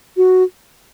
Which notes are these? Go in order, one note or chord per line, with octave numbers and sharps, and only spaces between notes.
F#4